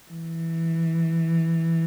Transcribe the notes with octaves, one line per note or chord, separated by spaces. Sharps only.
E3